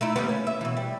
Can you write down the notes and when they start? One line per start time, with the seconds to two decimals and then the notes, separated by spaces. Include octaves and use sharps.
0.01 A3 D#4 E4
0.16 D#2 G3 B3
0.29 C#4
0.47 E5
0.61 B2 E3
0.77 G3